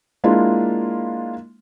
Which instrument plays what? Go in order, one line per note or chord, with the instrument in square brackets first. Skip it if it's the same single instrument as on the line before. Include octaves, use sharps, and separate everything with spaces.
[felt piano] G#3 A#3 D4 E4 F4